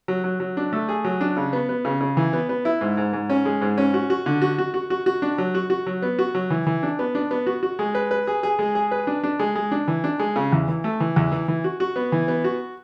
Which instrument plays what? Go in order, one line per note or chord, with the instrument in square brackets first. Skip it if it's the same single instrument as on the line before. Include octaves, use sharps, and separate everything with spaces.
[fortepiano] F#3
F#3
F#3
D4
A3
G#4
F#3
D4
C#3
B3
B3
C#3
C#3
E3
B3
B3
E4
G#2
G#2
G#2
C#4
G#3
G#2
C#4
F#4
F#4
D3
F#4
F#4
F#4
F#4
F#4
D4
F#3
F#4
F#4
F#3
B3
F#4
F#3
E3
E3
D4
B3
D4
B3
F#4
F#4
G#3
B4
B4
G#4
G#4
G#3
G#4
B4
D4
D4
G#3
G#3
D4
E3
D4
G#3
C#3
E2
E3
A3
E3
E2
E3
E3
F#4
F#4
B3
E3
B3
F#4